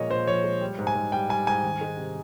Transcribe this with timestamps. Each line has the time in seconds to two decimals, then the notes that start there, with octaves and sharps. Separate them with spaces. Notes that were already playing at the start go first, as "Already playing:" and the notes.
Already playing: A#2 F3 G#3 A#4 C#5 D#5
0.10 A#2 C5
0.27 F3 C#5
0.44 G#3
0.61 G3
0.78 G#2
0.87 G#5
0.95 G#2
1.12 G3 G5
1.29 G3 G#5
1.47 G#2 G#5
1.63 D#3
1.81 G#3
1.97 C3